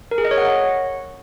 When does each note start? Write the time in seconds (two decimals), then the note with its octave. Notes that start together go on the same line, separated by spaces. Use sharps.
0.11 A#4
0.18 G#4
0.25 D#5
0.31 C#5
0.38 F#5